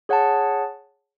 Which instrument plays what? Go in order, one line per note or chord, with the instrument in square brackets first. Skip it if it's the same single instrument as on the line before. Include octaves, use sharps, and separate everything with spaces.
[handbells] G#4 C#5 F#5 A5